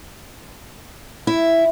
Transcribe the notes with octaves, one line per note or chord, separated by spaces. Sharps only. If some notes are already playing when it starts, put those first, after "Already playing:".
E4